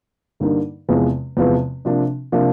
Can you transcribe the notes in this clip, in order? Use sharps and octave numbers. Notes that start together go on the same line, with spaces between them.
G2 D3 G3 A#3 D#4
E2 C3 F3 G#3 B3
E2 C3 F3 G#3 B3
C3 F3 A#3 D4
C3 F3 A#3 D4